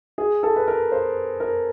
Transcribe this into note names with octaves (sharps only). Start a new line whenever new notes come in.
G#4
A4
B4
A#4
C5
A#4